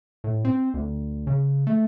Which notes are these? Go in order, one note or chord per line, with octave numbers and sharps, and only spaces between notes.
A2
C4
D2
C#3
A3